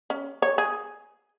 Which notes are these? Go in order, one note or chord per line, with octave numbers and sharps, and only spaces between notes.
C#4
C#5
G#4